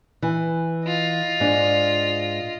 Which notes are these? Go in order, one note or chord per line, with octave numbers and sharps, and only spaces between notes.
E3
F4 D#5
G#2 D4